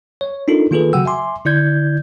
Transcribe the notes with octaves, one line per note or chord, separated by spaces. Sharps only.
C#5
D4 D#4 F4 A4 A#4
D#3 A#3 F4 G#4 A4 B4
C#3 F#3 F#4 F#5 G5 E6
E5 G#5 C6 D6
D3 E4 D5 G6 G#6